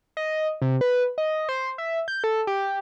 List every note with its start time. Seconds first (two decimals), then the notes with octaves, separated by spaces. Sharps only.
0.17 D#5
0.62 C3
0.81 B4
1.18 D#5
1.49 C5
1.78 E5
2.08 G6
2.24 A4
2.47 G4